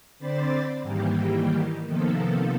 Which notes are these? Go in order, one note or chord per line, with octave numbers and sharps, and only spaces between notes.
D3 C4 C5 D5 B5 A6
G#2 D#3 E3 G3 A#3 G4
C3 D#3 F3 A#3 B3 A4